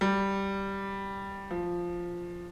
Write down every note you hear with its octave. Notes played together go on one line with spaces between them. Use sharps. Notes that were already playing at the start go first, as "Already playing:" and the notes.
G3
F3